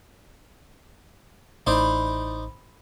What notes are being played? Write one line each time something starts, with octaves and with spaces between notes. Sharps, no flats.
A1 D#4 E4 C5 D5